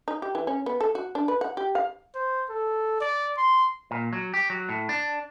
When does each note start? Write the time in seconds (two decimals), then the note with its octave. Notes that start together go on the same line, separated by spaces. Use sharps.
0.08 D#4
0.22 G4
0.35 E3
0.47 C#4
0.66 B3
0.81 A4
0.95 F#4
1.15 D4
1.28 B4
1.41 F#5
1.57 G4
1.75 F5
2.15 C5
2.50 A4
3.01 D5
3.37 C6
3.91 A#2
4.13 F#3
4.34 G4
4.50 F#3
4.69 A2
4.89 D4